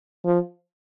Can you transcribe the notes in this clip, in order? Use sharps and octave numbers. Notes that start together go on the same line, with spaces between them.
F3